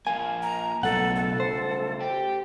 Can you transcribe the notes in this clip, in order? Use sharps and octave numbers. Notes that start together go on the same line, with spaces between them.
F3 A#3 G#5
A#5
B1 C#3 A3 A4 F#5
A4
C5
G4